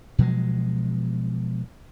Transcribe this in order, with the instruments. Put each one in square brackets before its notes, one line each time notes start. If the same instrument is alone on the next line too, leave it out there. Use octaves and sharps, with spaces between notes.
[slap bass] B2 F3 F#3 G#3